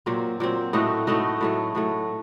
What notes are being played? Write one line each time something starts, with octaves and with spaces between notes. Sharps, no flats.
A#2 F#3 C4
A#2 F#3 C4
A2 A3 D#4 F#4
A2 A3 D#4 F#4
A2 F#3 A3
A2 F#3 A3